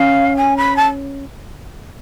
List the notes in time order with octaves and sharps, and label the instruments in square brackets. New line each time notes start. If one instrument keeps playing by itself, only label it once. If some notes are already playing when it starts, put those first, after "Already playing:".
Already playing: [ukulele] C#4 [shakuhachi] F5
[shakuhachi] G#5
B5
A5